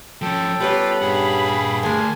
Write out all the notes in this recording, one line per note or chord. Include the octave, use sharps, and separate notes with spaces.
F3 C#4 A4 G5
G3 B3 C#4 F4 B5
G2 A#2 G#4 F#5
G#5
D2 G#3 A#3 G#5 A5